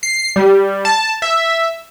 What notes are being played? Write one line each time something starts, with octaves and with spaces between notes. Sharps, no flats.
C7
G3
A5
E5